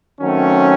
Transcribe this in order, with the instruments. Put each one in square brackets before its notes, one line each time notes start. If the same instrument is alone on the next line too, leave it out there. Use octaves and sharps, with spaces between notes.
[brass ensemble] D#3 F#3 A3 C4 C#4